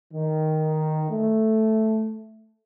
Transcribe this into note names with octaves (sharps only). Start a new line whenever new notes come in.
D#3
A3